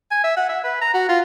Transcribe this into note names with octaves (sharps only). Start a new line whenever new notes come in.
G#5
E5
F#5
E5
B4
A#5
F#4
F4